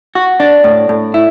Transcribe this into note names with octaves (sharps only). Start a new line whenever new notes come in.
F#4
D4
A2
A2
E4